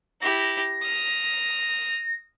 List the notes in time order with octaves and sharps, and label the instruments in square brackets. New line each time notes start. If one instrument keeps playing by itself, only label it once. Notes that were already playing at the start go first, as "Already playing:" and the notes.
[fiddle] E4 G4 [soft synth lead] A#6
[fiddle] D#6 F6